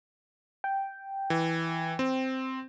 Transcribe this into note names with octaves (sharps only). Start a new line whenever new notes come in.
G5
E3
C4